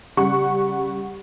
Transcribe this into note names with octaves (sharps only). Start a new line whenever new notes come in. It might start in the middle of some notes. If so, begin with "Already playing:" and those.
C#3 G3 F#5 C#6